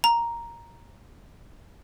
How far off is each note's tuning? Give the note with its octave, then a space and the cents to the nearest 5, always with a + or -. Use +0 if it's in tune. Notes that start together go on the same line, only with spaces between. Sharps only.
A#5 +5